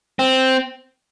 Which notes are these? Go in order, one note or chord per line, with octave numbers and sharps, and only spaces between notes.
C4